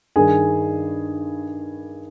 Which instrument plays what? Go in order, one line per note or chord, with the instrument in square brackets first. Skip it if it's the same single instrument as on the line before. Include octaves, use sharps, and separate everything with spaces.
[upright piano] G2 D#3 G#4 G#5